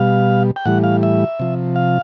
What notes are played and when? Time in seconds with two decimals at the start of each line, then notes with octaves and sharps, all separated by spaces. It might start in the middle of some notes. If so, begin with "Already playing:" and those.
Already playing: B2 G3 F5
0.56 G5
0.65 A2 E3 G3 F#5
0.84 F5
1.03 E5
1.39 C3 F3
1.76 F5